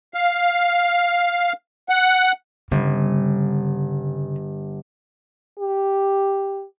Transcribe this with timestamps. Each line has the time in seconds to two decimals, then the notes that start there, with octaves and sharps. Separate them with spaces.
0.14 F5
1.89 F#5
2.71 G1 C#3
5.59 G4